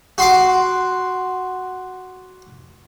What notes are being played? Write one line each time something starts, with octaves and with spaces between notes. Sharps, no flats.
F#4 C6 D6